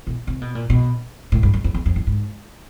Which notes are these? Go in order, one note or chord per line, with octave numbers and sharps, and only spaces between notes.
B2
C3
B2
A#2
B2
A2
G2
F#2
F2
E2
F2
G2
G#2